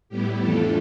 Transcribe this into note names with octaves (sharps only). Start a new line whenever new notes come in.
A2 G3 B3 E4 G4
F2 E3 A3 D4 F4 A4